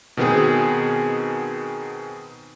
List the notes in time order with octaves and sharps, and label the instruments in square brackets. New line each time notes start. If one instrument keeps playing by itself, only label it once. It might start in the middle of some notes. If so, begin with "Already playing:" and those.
[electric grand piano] B2 D#3 B3 C4 G#4